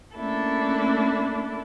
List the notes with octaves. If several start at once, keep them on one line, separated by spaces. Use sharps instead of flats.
A3 A#3 C#4 D4 E4 A4